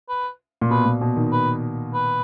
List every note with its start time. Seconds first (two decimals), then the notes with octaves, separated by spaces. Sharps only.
0.09 B4
0.62 A#2
0.70 B2 B4
0.86 A#2
1.01 B2
1.16 D#3
1.32 B4
1.94 B4